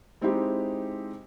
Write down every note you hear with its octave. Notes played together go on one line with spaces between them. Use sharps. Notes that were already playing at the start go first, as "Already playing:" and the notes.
G#3 C4 D#4 E4 G4